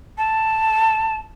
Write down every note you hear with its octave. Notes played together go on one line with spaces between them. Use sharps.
A5